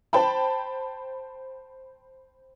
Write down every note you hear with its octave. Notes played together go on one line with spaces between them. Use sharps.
C5 G5 A5 B5